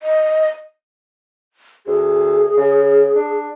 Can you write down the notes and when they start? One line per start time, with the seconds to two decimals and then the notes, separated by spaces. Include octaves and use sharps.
0.03 D#5
1.87 D2 G#4
2.57 C#3
3.15 D4